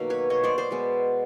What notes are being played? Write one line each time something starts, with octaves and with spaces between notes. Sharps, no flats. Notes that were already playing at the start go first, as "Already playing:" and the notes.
Already playing: B2 D#3 F#3 A#3
B4 C#5
C#5 D#5
C5 D5
C5 D5
B2 G#3 B3